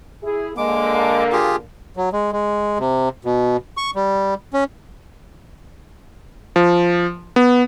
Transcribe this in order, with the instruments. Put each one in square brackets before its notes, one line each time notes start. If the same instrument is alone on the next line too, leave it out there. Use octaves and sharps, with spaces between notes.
[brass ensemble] E4 G#4
[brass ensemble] D3 A#3 [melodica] G#3 D6
[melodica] F4 G4 G#4
[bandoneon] F#3
G#3
G#3
C3
B2
C#6
G3
C#4
[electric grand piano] F3
B3